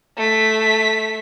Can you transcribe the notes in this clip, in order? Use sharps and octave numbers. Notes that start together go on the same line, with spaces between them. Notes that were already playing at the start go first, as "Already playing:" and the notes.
A3 B6